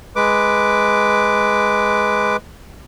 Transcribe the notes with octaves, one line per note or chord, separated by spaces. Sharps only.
G#3 B4 D6